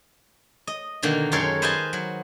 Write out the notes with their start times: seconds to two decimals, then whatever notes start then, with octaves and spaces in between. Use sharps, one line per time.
0.67 D#5
1.03 B2 D3 D#3 A#3
1.32 F#2 G#3 A4 A#4 C#5 C6
1.62 B4 C5 D#5 F5 G#5 A5
1.93 F#3